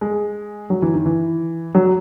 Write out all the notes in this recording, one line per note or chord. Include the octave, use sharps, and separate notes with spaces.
G#3
F#3
E3
D#3
E3
F#3